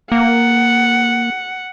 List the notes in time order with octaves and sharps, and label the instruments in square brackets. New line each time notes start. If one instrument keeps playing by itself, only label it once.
[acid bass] A#3 [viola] F#5